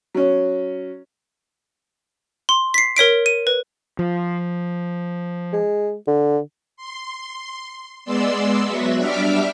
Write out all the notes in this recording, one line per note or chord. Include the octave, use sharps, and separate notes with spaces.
F#3 C#4
C6
B6 C7
A#4 C#5 B6 D7
D#7
B4
F3
G#3
D3
C6
G#3 B3 D5 C6 E6
F#3 B3 F#4 E5
G3 D4 E5 D6 F6 B6